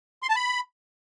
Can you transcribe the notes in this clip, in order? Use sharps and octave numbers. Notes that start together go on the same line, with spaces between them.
C6
A5
B5